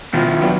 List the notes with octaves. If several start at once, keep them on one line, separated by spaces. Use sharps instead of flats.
B2 D#3 F3
F#3 B3 D4 G4